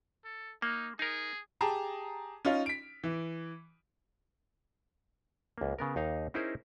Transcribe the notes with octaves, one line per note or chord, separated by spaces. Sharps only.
A4
A#3 D#4
D#4 G#4 A#4
G4 G#4 A5 A#5
C#4 D#4 F4
B6 D7
E3
C#2 A#3
C#3 B3 A#4
D#2 D#4 F5
C#4 D#4 E4 G#4 A#4 C5